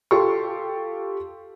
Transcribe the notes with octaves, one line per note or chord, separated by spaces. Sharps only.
F4 G4 A4 G5 C6 C#6